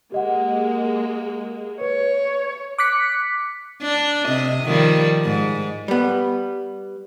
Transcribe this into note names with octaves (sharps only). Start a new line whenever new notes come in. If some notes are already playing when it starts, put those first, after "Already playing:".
G#3 A#3 G4 D#5 F#5
B4 C#5
D6 F#6 B6 C#7
D4
C3 D#5
D#3 F3 G3
G#2
G3 B3